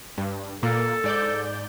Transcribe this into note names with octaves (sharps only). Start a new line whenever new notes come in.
G2
A#2 A#3 A4
G#2 D5 G6